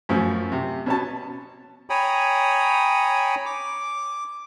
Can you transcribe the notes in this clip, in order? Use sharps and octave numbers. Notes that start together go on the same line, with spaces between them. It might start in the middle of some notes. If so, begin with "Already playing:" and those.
F#2 A2 F3
C3
B2 C#4 A5
C#5 G5 G#5 A#5 B5 D#6
D6